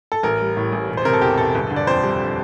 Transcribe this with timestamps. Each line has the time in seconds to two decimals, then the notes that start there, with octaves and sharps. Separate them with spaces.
0.12 A4
0.23 A1 A#4
0.40 G3
0.57 A2
0.72 A1
0.89 E1
0.97 C5
1.05 C3 A#4
1.13 A4
1.21 E2 G4
1.38 E1 A4
1.55 G1
1.71 D3
1.76 D5
1.87 F2 C5
2.03 G3